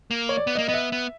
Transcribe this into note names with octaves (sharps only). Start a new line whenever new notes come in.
A#3
C#5
D5
B3
A#3 D#5
B3 D#5
E5
B3